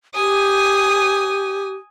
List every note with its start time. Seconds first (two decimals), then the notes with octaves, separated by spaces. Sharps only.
0.15 G4 G#5 D#6